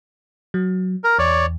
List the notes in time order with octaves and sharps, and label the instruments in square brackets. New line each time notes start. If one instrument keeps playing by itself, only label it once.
[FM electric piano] F#3
[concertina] A#4
[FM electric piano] E2 [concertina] C#5 D5